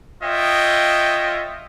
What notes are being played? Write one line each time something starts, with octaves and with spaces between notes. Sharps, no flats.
F4 C#5 D#5 E5 G5